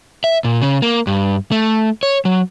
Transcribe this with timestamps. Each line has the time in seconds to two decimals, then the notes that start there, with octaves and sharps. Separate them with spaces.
0.24 E5
0.44 A#2
0.62 C#3
0.82 A#3
1.07 G2
1.52 A3
2.03 C#5
2.25 F#3